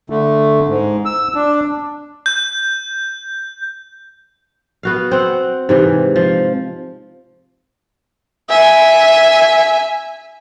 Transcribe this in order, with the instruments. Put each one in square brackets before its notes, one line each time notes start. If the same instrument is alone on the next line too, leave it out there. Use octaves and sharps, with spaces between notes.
[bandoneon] D3 A3
G#2
E6
D4
[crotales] G6
[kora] B3 F#4 F5
C4 F#5
G#2 C3 E3
F3
[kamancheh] E5 G#5